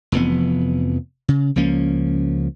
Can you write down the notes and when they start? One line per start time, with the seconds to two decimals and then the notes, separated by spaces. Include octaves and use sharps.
0.12 F1 F2 E3 B3
1.28 C#3
1.56 C#2 F3 A#3 C#4